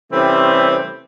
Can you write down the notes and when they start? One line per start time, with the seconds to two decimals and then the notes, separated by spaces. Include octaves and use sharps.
0.12 C3 E3 G3 A3 C4 C#4